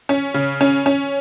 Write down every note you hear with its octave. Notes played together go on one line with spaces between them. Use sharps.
C#4
C#3
C#4
C#4